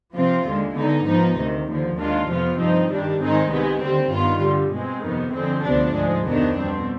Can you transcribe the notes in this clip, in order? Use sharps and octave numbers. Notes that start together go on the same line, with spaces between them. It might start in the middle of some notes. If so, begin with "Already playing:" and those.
C3 F3 C4 F4
D#2 D3 G#3
D3 G#3 B3 D#4
G#2 F3 B3 D#4
D2 C3 D#3
D#2 D3 F3
D#2 D#3 G#3 D4 F4
F2 C3 F3 B3 F4
G2 F3 C4 D#4
G2 D#3 G3 D4
G#2 D#3 G#3 C4 D#4
C2 C3 D#3 G#3 B3
D#2 D3 G3 C4
G2 D#3 B3 F4
G2 D3 G3
B2 G#3 C4
F2 C3 D#3 B3
F2 D3 G#3 C4
D2 C3 F3 B3 D4
G#2 F3 G#3
F2 C3 D#3 B3 D4
B2 G3 C4